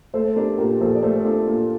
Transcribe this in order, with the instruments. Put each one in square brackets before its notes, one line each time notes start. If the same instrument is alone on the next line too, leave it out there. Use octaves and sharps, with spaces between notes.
[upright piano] A3 [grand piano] A4 C5
[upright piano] D4 [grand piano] G4 A#4
[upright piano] A#2 [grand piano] G4 A#4
[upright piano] A#1 [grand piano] A4 C5
[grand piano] D5
[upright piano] A3 [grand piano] A4 C5
[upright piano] D4 [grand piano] F4 A4
[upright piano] A#2 [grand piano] F4